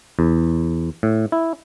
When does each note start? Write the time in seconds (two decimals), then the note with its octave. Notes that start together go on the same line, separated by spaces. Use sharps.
0.19 E2
1.03 A2
1.32 E4